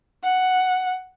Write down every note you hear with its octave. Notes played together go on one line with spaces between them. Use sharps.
F#5